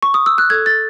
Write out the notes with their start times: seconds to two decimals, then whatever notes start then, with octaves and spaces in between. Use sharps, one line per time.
0.03 C#6
0.14 D#6
0.26 E6
0.38 F#6
0.50 A4 G#6
0.66 A6